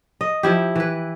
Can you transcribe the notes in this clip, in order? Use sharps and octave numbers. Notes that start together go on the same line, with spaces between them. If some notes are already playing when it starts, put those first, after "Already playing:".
D#5
F3 E4 G4
E3 B4